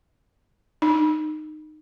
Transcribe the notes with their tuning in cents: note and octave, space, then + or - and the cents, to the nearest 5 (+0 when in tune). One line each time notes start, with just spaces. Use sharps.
D#4 -20